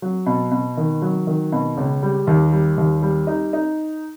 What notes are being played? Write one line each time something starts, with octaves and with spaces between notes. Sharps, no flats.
F#3
B2
B2
D#3
F#3
D#3
B2
C#2
G3
D#2
G3
D#2
G3
D#4
D#4